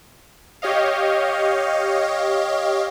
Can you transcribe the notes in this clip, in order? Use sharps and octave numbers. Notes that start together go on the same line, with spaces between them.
G4 C#5 D#5 F5